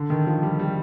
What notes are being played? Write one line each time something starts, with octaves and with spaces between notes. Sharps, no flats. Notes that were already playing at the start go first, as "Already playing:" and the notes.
Already playing: D3
D#3
F3
G3
G3